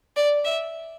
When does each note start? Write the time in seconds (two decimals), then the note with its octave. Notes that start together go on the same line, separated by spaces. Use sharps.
0.17 D5
0.45 E5